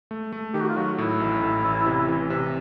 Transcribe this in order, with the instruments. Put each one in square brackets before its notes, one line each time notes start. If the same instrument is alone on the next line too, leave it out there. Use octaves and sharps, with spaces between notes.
[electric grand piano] A3
A3
[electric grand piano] D#3 [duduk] G4
[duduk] F#4
F4
[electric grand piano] F#3 [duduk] F#4
[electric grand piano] A2 [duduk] E4
[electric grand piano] A1
A2
A1
C3
E3
C3